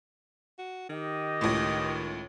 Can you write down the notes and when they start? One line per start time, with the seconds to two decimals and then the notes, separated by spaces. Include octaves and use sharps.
0.58 F#4
0.89 D#3 G4 D#5
1.41 C#2 A2